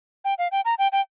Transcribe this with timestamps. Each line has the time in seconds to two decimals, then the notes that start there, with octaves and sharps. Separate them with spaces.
0.25 G5
0.38 F5
0.52 G5
0.65 A#5
0.78 G5
0.92 G5